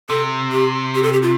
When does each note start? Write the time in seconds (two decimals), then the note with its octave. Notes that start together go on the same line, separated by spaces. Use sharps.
0.09 C3 A4
0.52 G4
0.95 G4
1.03 A4
1.13 G4
1.22 F4